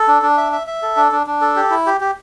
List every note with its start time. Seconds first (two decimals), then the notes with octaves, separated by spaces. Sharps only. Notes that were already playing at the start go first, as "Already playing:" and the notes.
Already playing: A4
0.08 D4
0.22 D4
0.37 E5
0.52 E5
0.67 E5
0.82 A4
0.97 D4
1.12 D4
1.27 D4
1.41 A4
1.56 G4
1.71 E4
1.86 G4
2.01 G4